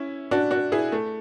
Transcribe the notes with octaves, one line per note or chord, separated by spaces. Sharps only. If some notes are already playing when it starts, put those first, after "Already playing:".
Already playing: C#4 E4
D4 F#4
D4 F#4
E4 G#4
A3